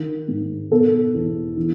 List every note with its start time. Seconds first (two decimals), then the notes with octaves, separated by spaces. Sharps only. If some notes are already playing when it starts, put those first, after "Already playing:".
Already playing: D#3
0.28 G#2
0.71 B2 A4
1.14 E2
1.57 E3